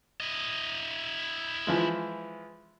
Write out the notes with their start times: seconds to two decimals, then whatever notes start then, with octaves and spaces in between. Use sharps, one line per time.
0.20 E4 D#5
1.67 E3 F3 G#3